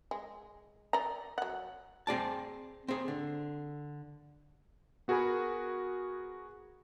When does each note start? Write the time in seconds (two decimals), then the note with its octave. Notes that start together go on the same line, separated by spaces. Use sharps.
0.11 G#3
0.93 D5 A#5
1.38 F#3 F#5
2.07 C4 G#4 D5 A5
2.88 C4 G#4
3.08 D3
5.08 B3 F#4 G#4 A#4 G#5 B5